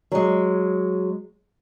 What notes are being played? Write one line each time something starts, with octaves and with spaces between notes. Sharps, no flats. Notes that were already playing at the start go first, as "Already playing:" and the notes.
F#3 G#3